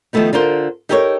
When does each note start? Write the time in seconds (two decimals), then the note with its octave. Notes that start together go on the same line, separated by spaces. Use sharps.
0.13 D#3 F3 F#3 A3 B3 D#4
0.33 D3 F4 A#4 C5
0.89 D#4 G4 A4 A#4 C5 C#5